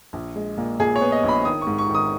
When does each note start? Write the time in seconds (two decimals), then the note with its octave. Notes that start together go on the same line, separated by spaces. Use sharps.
0.13 A#1
0.36 G#3
0.58 A#2
0.80 A#2 G#4
0.96 C#5
1.01 B3
1.12 D#5
1.24 A#1 B5
1.45 D#3 D#6
1.61 C#6
1.67 G#2
1.78 C#6
1.89 D#3
1.95 D#6